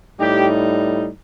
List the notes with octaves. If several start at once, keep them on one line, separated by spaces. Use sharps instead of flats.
A2 G3 D#4 G4